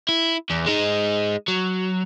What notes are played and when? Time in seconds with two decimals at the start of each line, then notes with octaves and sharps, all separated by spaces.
0.09 E4
0.50 E2
0.66 G#3 D#4
1.48 F#3